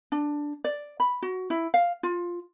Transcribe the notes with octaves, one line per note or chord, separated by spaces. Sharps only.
D4
D5
B5
F#4
E4
F5
F4